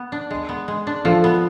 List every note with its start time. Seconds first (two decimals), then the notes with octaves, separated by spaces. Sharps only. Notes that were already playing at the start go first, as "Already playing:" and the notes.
Already playing: B3
0.12 D4
0.31 G#3
0.49 B3
0.68 G#3
0.87 D4
1.05 F3 F4 A4
1.24 B3